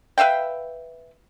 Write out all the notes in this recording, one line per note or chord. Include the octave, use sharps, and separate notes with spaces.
B4 E5 F5 G5